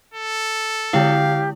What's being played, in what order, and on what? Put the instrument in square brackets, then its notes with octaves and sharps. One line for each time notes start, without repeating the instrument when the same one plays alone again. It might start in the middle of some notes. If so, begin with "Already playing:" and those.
[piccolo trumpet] A4
[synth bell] D3 G#3 E4 [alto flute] G4 [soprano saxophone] F5